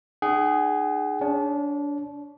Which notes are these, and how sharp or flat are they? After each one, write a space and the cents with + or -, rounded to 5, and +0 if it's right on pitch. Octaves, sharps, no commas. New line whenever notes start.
D#4 -40 G#4 +0 F#5 +40
D4 -25 C#5 +0